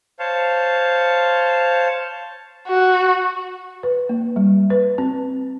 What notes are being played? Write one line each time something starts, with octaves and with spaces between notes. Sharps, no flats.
C5 C#5 F5 A5
F#4
B4
A#3
G3
B4
C4